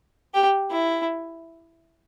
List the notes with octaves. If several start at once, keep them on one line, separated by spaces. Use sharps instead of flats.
G4
E4